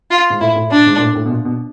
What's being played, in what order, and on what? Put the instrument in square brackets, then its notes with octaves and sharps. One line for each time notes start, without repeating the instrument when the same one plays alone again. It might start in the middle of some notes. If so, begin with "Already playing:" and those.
[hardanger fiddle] F4
[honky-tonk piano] G#2
[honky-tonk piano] A2 [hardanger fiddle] E4
[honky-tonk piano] A2
[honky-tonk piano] A#2 [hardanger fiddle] D4
[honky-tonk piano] G#2
A#2
A2
A2
B2
A#2
B2